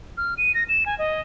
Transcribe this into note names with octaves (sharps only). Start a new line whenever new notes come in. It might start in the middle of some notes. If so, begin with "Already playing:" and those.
F6
D#7
A#6
E7
G#5
D#5